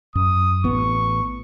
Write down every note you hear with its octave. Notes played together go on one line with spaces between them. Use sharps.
F#2 D#6
A1 B3 C#6